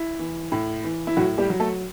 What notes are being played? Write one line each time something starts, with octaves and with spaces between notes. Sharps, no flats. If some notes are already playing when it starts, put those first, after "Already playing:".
Already playing: E4
E3
A2
E3
E4
A2 F#3 F#4
G3 G4
F#3
A3 A4